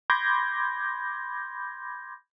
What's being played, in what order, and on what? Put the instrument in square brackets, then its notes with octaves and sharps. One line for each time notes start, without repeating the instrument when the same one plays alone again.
[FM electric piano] B5 C6 D6 G6 G#6 A#6